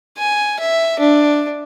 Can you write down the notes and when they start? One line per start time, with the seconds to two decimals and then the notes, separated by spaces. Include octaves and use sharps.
0.18 G#5
0.60 E5
0.99 D4